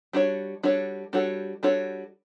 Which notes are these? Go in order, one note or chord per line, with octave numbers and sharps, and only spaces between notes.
G3 D4 F#4 A4 C#5
G3 D4 F#4 A4 C#5
G3 D4 F#4 A4 C#5
G3 D4 F#4 A4 C#5